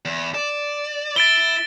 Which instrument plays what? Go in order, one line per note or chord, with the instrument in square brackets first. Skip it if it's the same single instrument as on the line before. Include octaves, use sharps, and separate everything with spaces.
[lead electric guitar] E2
[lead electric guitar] D5 [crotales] E7
[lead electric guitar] E4 [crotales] A6 D7 G7